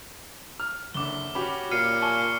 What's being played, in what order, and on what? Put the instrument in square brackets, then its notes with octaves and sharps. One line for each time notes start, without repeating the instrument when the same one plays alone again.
[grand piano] F6
[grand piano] F#1 D3 [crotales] D6 G7
[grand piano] C#4 G4 [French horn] F#4 [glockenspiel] B5
[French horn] A#2 [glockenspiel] F6 [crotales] C7 C#7 D#7
[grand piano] G#5 [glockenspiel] A5 C#6 [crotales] G7